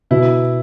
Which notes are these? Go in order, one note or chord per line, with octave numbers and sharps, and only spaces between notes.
B2 E4